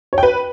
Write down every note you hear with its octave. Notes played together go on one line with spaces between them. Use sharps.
C#5
G5
B4